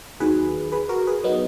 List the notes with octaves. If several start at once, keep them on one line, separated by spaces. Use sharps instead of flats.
D#2 D#3 F#3 G#4 B4
G#4 B4
F#4 A#4
G#4 B4
F#3 B3 D#4